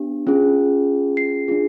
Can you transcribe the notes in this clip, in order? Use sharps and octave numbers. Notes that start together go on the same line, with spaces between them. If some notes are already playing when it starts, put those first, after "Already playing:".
Already playing: B3 D4 G4
C#4 F4 G#4
C7
D4 F4 G#4